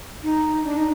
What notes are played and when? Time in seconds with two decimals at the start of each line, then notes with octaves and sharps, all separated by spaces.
0.23 D#4
0.64 D4
0.77 D#4